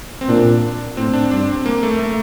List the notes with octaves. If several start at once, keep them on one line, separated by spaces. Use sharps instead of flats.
C4
A#2 D4
A2 C4
D4
G2 D4
C4
A#3
A3
A3